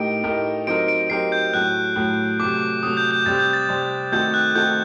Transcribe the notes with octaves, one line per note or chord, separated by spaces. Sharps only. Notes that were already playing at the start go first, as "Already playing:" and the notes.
Already playing: A2 A3 D#4 G4 A#4 D7
A2 A3 D#4 G4 A#4
F#3 C4 D#4 G4 A#4 D7
D7
F#3 C4 D#4 G4 A#4 C7
G6
A2 F#3 A3 F#6
A2 F#3 A3
C3 F#3 A3 D6
D6
C3 F#3 A3 D#6
G6
G6
C3 G3 C4 A6
G6
A6
C3 G3 C4
D#3 A3 C4 F#4 A4 G6
F#6
D#3 A3 C4 F#4 A4 G6